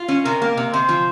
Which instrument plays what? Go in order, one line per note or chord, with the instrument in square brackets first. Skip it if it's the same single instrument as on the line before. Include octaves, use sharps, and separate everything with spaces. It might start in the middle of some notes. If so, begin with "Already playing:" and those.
Already playing: [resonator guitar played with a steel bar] F4
C#4
[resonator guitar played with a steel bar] C3 [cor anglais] A#4
[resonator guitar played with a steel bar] A#3
C3
[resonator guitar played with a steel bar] C3 [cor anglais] C5
[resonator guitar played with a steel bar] F3